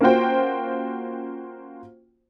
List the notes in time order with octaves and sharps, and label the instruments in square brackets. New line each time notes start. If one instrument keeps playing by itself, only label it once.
[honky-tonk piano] A#3 C#4 F4 F#4 C5 G5